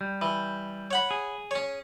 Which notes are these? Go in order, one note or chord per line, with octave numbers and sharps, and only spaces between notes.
G3
E3
C#5 F#5 B5
G#4
C#4 C#5